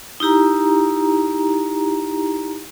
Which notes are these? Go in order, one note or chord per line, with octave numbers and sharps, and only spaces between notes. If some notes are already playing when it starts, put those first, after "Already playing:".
D#4 E4 G4 A#5